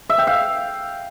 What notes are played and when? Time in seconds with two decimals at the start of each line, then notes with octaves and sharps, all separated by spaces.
0.10 E5
0.18 G5
0.27 F5